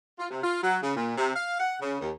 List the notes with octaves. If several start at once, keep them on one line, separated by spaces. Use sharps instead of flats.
F4
C3
F4
F#3
C#3
A#2
C3
F5
F#5
C#3
D#2